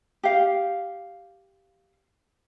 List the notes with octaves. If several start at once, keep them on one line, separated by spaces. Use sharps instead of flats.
G4 F5